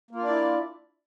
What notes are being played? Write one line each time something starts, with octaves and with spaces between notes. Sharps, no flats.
A#3 D4 E4 F4 D5